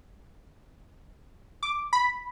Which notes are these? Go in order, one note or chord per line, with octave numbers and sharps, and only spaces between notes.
D6
B5